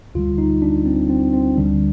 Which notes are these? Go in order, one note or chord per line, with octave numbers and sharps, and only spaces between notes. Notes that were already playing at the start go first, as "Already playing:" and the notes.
D2 D3 G3 F4
D#4
D4
C4
C4
C4
D2 D3 G3 D4